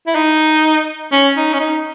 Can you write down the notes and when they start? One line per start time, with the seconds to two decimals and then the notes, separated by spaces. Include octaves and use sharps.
0.07 E4
0.15 D#4
1.12 C#4
1.36 D#4
1.53 C#4
1.60 D#4